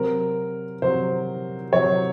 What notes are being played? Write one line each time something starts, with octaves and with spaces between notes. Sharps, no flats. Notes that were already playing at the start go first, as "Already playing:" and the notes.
Already playing: C3 F#3 C4 A#4
C3 F#3 C4 C5
C3 F#3 C4 C#5